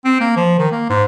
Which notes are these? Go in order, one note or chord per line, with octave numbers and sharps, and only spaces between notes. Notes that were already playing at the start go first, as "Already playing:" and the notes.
C4
A#3
F3
D#3
A#3
G#2